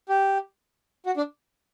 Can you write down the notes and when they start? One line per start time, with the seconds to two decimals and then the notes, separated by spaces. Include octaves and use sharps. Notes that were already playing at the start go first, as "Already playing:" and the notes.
0.09 G4
1.06 F#4
1.17 D4